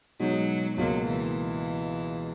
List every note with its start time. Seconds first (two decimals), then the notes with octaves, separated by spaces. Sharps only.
0.20 B2 F#3 G#3 D#4 G#4
0.77 C#2 B2 F#3 A#3
1.07 E3